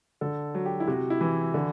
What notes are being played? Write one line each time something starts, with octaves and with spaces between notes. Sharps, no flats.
D3 A4
F#3
G4
E4
C3 F#4
E4
E3
D3